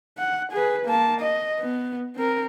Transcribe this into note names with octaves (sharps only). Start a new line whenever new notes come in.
F#5
G#4 B4
A#3 A5
D#5
B3
C4 A#4